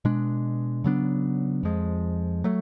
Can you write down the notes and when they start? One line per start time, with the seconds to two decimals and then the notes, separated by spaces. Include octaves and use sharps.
0.05 B2 G#3 D4
0.84 C#3 F#3 B3 D4
1.63 F2 F3 G#3
2.44 F#3 A3